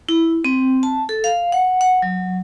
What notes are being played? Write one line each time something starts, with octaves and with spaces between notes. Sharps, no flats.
E4
C4
A5
A4
F5
F#5
F#5
F#3